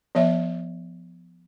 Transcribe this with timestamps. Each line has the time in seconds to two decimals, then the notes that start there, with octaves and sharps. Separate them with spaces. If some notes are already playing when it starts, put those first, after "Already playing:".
0.15 F3 B3 C#5 E5